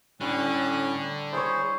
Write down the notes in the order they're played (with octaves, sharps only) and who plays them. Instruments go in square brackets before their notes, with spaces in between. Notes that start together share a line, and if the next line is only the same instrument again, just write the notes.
[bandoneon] A2 C#4 F#6 [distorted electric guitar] D3 [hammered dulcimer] G3
[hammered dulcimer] E4 C#5 [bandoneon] G#4 C5